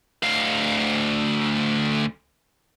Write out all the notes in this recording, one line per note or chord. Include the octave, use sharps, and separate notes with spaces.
D2 F5